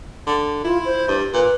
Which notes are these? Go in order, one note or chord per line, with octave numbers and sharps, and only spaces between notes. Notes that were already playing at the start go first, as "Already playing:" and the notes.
D3
E4 F4
C5
G2
A#2 B4